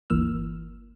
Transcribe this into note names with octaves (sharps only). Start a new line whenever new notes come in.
G1 D2 E3 A#3 E6 F6